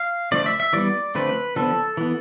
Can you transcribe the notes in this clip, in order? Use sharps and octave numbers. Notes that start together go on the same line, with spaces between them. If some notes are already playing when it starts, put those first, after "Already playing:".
Already playing: F5
D3 F3 A3 D5
E5
E5
E3 G3 B3 D5
D3 F3 A3 C4 B4
D3 F3 B3 A4
E3 B3